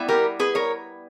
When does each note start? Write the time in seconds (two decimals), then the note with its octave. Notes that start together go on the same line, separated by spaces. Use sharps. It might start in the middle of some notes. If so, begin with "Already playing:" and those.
Already playing: G3 B3 E4
0.08 G4 A#4
0.40 G#4 B4
0.55 A#4 C#5